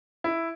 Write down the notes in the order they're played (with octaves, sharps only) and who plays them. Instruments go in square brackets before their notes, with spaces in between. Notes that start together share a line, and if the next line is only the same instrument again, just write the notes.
[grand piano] E4